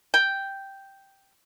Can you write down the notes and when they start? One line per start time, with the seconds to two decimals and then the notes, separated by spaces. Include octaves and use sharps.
0.14 G5